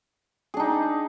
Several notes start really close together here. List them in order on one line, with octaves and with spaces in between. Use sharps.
G#4 D4 D#4